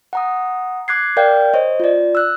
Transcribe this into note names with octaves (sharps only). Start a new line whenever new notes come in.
F#5 A#5 D#6
D6 F#6 G#6 C7
A#4 D5 F5 G5 G6
C5 C#5 D#5
F4 D5
E6 F#6